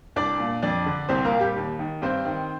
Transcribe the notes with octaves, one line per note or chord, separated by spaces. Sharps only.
C2 D4 D5
A#2
F2 D4 D5
D3
C2 C4 C5
A#3 A#4
A#2
G3 G4
D#2
D#3
G2 C4 C5
D#3